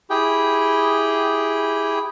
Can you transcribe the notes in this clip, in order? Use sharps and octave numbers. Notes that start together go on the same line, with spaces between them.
E4 G4 G#4 G5